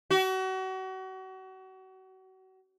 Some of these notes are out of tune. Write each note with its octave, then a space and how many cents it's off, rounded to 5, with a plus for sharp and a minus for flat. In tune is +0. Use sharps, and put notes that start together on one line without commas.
F#4 +35